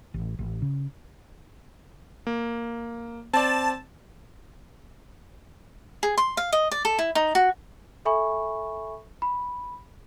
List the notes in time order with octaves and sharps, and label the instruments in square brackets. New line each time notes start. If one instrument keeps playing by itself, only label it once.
[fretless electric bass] A1
A1
C#3
[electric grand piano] A#3
[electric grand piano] C4 D5 [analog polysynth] A5
[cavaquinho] G#4
C6
F5
D#5
D5
A4
E4
D#4
F#4
[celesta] A4 E5 G#5 B5 C#6
B5